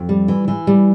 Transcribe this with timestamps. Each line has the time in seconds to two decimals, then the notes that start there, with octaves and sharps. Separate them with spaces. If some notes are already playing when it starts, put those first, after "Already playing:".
Already playing: F2
0.09 G3
0.28 E3
0.48 E3
0.67 G3